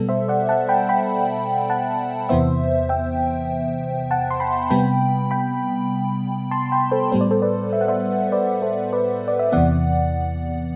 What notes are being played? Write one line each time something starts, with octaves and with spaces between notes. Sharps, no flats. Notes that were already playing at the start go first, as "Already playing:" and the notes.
Already playing: B2 G3 B3 A4
C5 E5
D5 F#5
F#5 A5
G5 B5
G5 B5
F#5 A5
E2 C3 E3 B3 C5 E5
E5 G5
F#5 A5
C6
G5 B5
C3 G3 B3 G5 B5
G5 B5
A5 C6
G5 B5
A4 C5
A2 G3 B3 C5
D5
A4 C5
B4 D5
E5
F#5
C5 E5
B4 D5
A4 C5
B4 D5
D5
E5
E2 C3 E3 B3 D5 F#5